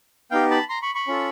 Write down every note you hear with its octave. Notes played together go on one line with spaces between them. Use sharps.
B3 D#4 G4 F5 G5
A5 B5
A#5 C6
B5 C#6
B5 C#6
C#4 F4 A4